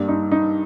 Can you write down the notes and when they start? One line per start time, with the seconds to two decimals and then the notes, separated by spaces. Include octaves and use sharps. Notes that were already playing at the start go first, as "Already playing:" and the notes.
Already playing: G2 G3 A#3
0.08 D#4
0.31 D#4